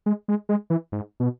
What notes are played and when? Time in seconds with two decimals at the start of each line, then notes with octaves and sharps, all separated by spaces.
0.06 G#3
0.28 G#3
0.49 G#3
0.70 E3
0.92 G#2
1.20 B2